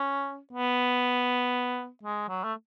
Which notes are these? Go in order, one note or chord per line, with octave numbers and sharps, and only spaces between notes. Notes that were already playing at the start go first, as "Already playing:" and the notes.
Already playing: C#4
B3
G#3
F#3
A3